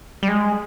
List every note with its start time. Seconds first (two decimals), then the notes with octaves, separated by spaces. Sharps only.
0.23 G3
0.28 G#3